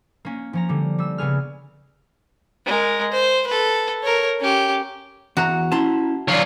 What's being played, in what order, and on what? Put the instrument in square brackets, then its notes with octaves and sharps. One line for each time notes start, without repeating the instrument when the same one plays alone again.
[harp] A#3 C#4
F3 C#4 A#5
D3 G3
G3 E6
C#3 B3 G#4 F6
[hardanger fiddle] G#3 A#4
C5
A4 B4
A#4 C#5
C#4 G4
[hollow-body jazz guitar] E2 A#5 [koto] F#4
[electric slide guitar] C#4 E4 [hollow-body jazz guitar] A5 A#5 C6
[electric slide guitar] D3 D5 [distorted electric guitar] F#3 F4